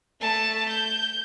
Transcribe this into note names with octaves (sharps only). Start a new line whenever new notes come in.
A3 A5
G6